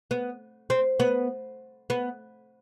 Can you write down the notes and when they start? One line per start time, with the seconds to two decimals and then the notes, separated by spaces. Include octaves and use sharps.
0.11 B3
0.70 C4
1.00 B3
1.90 B3